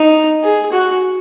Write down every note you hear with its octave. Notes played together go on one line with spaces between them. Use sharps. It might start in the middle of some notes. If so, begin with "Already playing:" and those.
Already playing: D#4
G#4
F#4